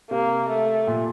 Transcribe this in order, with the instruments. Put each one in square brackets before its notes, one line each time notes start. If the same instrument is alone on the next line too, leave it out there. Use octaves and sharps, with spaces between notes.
[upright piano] C3 [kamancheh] A#3
[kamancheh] A3
[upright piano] A#2